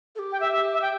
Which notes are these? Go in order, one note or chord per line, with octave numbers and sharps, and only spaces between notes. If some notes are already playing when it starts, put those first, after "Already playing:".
A4
G4
G5
E5
E5
E5
G5